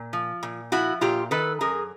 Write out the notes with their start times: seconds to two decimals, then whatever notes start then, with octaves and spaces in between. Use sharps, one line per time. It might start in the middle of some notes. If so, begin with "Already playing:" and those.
Already playing: A#2
0.13 F3
0.43 A#2
0.72 F3 E4 F#4
1.01 A#2 F4 G4
1.31 D#3 A4 B4
1.61 F#2 G#4 A#4